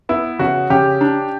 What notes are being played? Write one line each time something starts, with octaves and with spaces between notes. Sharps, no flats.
B3 E4
C#3 F#4
C#3 G4
D4